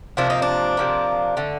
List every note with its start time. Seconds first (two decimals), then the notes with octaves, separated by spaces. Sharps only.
0.17 C3 F3 A#3 D4
0.30 D#4
0.42 D4
0.77 C3 F3 A#3
1.37 D3 A3